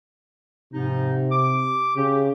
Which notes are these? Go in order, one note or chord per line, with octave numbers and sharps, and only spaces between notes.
G#2 C3 F3 D#4
D6
C#3 G4